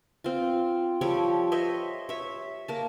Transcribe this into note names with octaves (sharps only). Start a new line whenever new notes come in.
C4 F4
F3 G3 A4 C#5
C5 C#5 D#5 E5
C#5 E5
A#3 A5